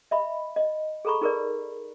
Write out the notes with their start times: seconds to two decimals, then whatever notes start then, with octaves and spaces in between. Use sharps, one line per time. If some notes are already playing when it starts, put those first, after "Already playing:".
0.11 D#5 E5 B5
0.56 D#5
1.05 G#4 A4 A#5 B5 C#6
1.22 D#4 G#4 A#4 B4 D5